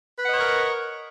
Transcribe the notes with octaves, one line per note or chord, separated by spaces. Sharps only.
A#4 B4 C#5 D#5 F#5